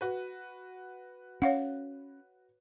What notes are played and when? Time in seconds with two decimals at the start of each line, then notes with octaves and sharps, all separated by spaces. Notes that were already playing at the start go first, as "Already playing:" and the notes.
0.01 F#4 B4
1.42 C#4 C#5 F5 F#5